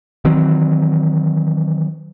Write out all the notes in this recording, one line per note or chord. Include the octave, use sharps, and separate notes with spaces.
D#3 E3 F#3 C4